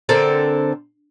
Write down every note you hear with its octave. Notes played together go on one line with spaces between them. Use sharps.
D3 C4 A4 A#4